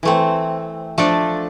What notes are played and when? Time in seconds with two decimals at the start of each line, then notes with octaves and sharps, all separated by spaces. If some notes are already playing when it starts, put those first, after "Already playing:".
0.03 E3 A3 C4
0.98 F3 A3 D4 A4 D5